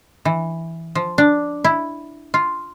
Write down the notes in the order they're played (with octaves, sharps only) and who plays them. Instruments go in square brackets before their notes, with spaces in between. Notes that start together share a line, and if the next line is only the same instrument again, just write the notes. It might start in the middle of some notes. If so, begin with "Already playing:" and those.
[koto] E3
F3
D4
E4
F4